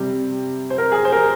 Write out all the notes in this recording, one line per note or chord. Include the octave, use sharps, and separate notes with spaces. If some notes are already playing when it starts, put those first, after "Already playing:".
Already playing: C3 G3
C5
A#4
G#4
C5
A#4